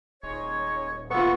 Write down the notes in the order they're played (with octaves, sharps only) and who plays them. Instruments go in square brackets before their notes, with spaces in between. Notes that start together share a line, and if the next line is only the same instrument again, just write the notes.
[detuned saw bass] D#1 [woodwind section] G#3 D#4 C#5
[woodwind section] E3 A4 [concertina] B3 C#6 [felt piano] F4 B4